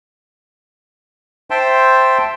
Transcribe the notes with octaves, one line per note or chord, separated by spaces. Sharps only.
C5 E5 G5 A5 C6